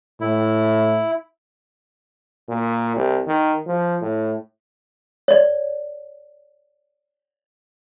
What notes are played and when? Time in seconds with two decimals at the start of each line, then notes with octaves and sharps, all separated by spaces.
0.21 A2 E4
2.49 A#2
2.96 C2
3.27 D#3
3.67 F3
4.02 A2
5.28 C#5 D5